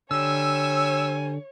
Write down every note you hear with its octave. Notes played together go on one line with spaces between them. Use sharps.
D3 G3 C#5 G#5 E6